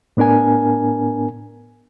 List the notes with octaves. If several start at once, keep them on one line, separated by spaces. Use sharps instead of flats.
A2 B3 D4 A#4 G#5